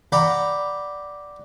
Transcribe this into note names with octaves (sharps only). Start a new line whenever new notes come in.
D5 F#5 G5 A#5 B5